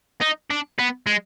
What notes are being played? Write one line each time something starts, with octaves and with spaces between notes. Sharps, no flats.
D#4
D4
B3
G#3